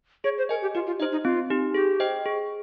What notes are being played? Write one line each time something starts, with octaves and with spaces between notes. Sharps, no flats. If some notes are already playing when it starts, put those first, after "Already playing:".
G#4 C#5
C5
A#4 D#5 G#5
G4
F4 G4
F4
D#4 C5 D#5
D#4
C4 F4
D#4 G4
G4 G#4
C5 D#5 G5
G#4